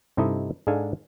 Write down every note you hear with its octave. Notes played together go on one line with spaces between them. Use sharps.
G2 C3 D#4 E4 A4 D#5
G#2 G#3 D4 A4 F5 G#5